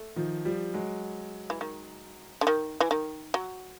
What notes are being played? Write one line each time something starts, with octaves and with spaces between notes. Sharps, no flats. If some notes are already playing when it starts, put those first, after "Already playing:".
Already playing: A3
D#3 F3
F3 G3
F#3 G#3
E3
D#3
D3
D#3
E3
D#3
F#3